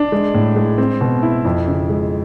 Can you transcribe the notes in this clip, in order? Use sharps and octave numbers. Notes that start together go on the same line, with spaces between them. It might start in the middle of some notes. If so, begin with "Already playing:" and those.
Already playing: D4
G#3
A2
G#3
C4
B2
E4
F2
C#3
G#3